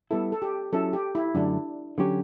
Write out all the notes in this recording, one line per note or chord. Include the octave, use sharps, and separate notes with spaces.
G3 B3 E4 A4
A4
G4
F#3 C#4 E4 A4
G4
E4
F#2 D3 F#3 A3 D4
D3 F#3 C#4 G4 C#5